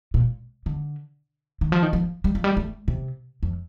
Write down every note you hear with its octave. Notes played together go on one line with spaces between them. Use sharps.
A#2
D3
D#3
F3
D#3
F3
G3
F3
G3
A3
C3
F2